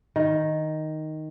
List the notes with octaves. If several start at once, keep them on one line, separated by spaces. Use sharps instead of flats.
D#3